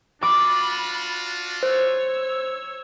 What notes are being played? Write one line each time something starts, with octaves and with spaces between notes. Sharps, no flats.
D4 F4 F#4 B5 D6
C5 C#5 E6